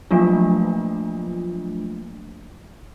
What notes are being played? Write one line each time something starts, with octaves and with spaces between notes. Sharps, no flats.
F3 F#3 A3 A#3 D4 F4